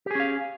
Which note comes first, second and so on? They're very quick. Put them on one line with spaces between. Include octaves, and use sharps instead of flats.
G4 G#4 C#4 F5